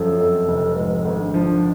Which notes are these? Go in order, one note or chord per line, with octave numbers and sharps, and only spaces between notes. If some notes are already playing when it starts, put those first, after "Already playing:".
Already playing: F#2 F3 A4
F2
F1
G#2 B4
A4
G#1 G#4
D4
F3 D4